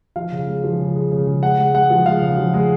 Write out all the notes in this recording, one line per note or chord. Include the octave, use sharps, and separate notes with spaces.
F3 F5
C#3
G#3
F3
C#3
G#3
C#3
C#3
G#3 F#5
G#3
G#3 F#5
F3
G#3 F5
C#3
F3
G#3